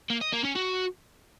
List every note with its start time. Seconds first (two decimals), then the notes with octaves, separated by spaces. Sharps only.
0.10 A#3
0.21 D#5
0.32 A#3
0.44 C#4
0.55 F#4